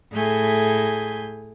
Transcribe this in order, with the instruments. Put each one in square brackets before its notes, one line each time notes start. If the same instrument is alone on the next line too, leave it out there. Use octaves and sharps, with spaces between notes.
[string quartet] A2 A3 G#4 G#5 G6